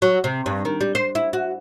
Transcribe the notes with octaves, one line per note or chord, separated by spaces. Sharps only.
F#3
C3
G2
D#3
G3
C5
E4
F#4